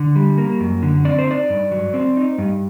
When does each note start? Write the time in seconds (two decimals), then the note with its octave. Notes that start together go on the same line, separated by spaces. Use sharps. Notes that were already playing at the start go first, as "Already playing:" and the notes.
Already playing: D3
0.16 G3
0.38 A#3
0.60 F#2
0.83 D3
1.05 C4 D5
1.19 C5
1.27 D#4 D5
1.50 G2
1.71 F#3
1.94 C4
2.17 D#4
2.38 G2